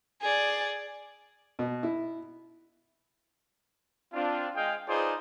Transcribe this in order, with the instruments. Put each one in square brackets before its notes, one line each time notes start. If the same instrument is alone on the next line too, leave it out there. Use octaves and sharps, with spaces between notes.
[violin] G#4 D5
[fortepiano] B2
E4
[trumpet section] C4 D4 F4
G#3 G#4 D#5 F5 G5
D#4 F4 G#4 B4 C5 D5